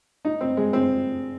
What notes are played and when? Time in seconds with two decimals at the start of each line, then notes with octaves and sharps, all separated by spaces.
0.25 D#4
0.41 C4
0.57 G#3
0.73 C4